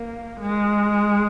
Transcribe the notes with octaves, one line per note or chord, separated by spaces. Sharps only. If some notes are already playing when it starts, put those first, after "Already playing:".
Already playing: A#3
G#3